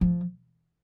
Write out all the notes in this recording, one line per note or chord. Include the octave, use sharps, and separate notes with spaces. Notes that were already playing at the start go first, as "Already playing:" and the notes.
F3